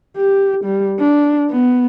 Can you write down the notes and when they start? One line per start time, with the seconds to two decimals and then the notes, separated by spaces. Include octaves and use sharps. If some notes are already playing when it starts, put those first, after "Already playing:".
0.16 G4
0.64 G3
0.99 D4
1.50 B3